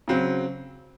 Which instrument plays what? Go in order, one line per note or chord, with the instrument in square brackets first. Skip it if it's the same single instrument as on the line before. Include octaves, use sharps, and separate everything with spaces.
[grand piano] C#3 F#3 C4